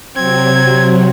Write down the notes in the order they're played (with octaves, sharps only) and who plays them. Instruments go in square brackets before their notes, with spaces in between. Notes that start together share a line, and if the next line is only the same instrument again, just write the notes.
[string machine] C3 F#3 [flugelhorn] C4 [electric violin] G#6